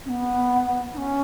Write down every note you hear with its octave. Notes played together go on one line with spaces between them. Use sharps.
C#4
B3
D#4
C#4